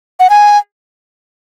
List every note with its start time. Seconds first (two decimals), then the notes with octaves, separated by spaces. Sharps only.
0.20 F#5
0.30 G#5